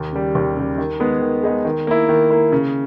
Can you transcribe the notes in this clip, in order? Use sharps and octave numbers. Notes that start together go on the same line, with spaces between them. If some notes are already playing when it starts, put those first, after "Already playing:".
Already playing: D#2
C#3 G3
D#2
C#3 G3
D#3
G#3 B3 D#4 G#4
D#3
G#3 B3 D#4 G#4
D#3
A#3 E4
D#3
A#3 E4
C#3